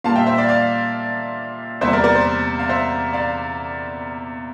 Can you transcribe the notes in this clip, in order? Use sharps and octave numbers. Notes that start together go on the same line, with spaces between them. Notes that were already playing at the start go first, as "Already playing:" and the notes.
A#2 G3 A#3 F5 A5
E5 G5
C5 E5
D5 F5
D5 F5
E2 C3 G3 A#3 C5 E5
A#4 D5
A#4 D5
C5
F5
C5 E5
D5 F5